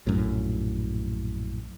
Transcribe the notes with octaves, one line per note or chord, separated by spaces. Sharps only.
A#1 F#2 A2